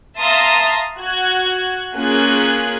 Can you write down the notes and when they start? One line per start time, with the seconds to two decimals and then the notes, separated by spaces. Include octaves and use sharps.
0.17 E5 F5 A5 A#5 C6 D#6
0.98 F#4 F#6 G#6
1.94 A#3 C#4 F4 G#4 F#6